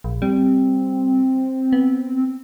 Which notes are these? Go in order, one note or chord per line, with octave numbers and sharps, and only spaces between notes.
A#1
G3 C4
B3